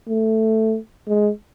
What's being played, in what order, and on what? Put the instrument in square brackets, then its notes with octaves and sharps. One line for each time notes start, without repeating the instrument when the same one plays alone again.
[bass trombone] A3
G#3